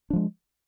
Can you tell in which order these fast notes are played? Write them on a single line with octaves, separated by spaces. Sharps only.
D4 F3 G#3